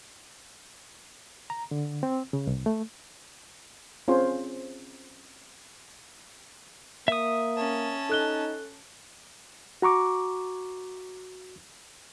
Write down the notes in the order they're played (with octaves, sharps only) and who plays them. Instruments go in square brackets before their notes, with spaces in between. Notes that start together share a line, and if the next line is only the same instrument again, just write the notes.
[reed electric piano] A#5
D3
C4
C#3
C2
A3
[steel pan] C4 C#4 F4 G#4 C5 C#5
[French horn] A#3 [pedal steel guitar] E5 D#6
[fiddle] C#4 A5
[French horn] D#4 [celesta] A4 F#6 G7
[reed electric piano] F#4 A#5 C#6 D6